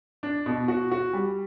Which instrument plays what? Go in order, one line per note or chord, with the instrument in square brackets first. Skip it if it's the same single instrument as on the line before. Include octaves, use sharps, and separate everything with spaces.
[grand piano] D4
B2
F#4
F#4
G3